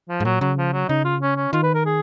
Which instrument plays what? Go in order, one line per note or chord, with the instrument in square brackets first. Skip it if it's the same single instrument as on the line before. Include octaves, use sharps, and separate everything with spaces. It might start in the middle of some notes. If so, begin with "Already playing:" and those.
[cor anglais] F3
[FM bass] G#2
[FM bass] A#2 [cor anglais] F#3
[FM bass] C#3 [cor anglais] F#3
[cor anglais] F3
F#3
[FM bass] C#3 [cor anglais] D#4
[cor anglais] F4
C#4
C#4
[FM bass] D#3 [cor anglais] F4
[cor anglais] B4
A#4
G#4